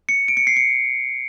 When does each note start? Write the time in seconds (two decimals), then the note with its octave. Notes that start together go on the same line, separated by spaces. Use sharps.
0.09 C#7
0.28 D7
0.37 C#7
0.47 C7
0.57 C#7